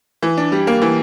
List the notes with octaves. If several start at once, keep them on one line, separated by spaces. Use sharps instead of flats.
E3
D4
G3
A#3
E3